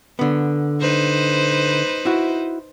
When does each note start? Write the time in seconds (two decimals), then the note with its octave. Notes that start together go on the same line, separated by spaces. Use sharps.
0.19 D3 B3
0.81 D#4 B4 C5
2.05 E4 F#4